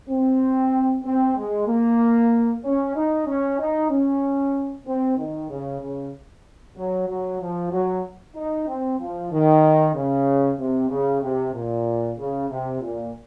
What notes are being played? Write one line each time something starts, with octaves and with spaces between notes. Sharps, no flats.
C4
C4
G#3
A#3
C#4
D#4
C#4
D#4
C#4
C4
D#3
C#3
C#3
F#3
F#3
F3
F#3
D#4
C4
F3
D#3
C#3
C3
C#3
C3
A#2
C#3
C3
A#2